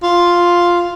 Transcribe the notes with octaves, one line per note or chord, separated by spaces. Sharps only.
F4